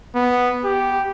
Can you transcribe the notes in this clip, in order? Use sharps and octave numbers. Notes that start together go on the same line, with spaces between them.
B3
G4